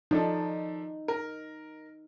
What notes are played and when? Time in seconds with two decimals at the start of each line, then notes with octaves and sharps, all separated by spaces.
0.11 F3 D4 D#4 A4
1.08 A#4